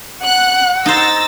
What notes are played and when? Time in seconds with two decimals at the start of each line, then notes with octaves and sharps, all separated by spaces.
0.22 F#5 F#6
0.86 D#4 C5 E6 A6 A#6